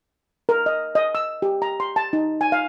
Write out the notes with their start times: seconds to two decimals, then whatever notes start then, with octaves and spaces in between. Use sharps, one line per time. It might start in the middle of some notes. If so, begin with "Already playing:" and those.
0.49 A#4
0.66 D#5
0.95 D#5
1.15 E6
1.42 G4
1.62 A#5
1.80 C6
1.96 A5
2.13 D#4
2.41 G#5
2.52 F5